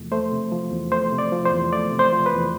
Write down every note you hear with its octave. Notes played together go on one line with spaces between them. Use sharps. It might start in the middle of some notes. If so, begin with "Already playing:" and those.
Already playing: E2 C3 F3 A3
A3 C5
C3
F3
E2
A3 C5
C3
D5
F3
C5
E2
A3 D5
C3
C5
F3
B4
E2